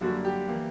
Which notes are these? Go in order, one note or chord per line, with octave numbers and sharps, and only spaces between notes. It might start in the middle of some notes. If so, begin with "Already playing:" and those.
F#2 D3 G3 A#3 F#4
G4
E3 A#3